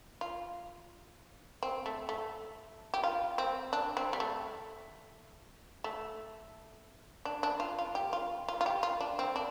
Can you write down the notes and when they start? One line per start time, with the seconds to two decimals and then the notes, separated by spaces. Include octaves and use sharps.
0.21 F4
1.63 C4
1.86 A3
2.09 A3
2.94 G4
3.04 F4
3.38 C4
3.73 D4
3.97 C4
4.13 G3
4.20 A3
5.84 A3
7.25 D4
7.43 D4
7.60 F4
7.79 F4
7.95 G4
8.13 F4
8.48 F4
8.61 F4
8.66 G4
8.83 F4
9.01 D4
9.19 C4
9.36 D4